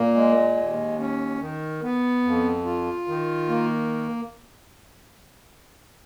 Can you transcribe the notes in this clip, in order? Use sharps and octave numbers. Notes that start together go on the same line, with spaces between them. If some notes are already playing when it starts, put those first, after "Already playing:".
Already playing: A#2 A#3
G#3
D#2
C#4
D#3
B3
F2
F4
D#3
A#3